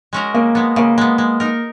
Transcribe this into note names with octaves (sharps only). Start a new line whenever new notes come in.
G#3 C#4 F#4 A#4
C#3 A#3
G#3 B3
C#3 A#3
G#3 B3
G#3
D#4 A#4